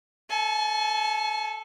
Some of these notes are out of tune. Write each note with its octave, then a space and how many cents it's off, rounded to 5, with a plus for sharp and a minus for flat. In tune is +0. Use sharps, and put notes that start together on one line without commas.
A4 +0 G#5 +40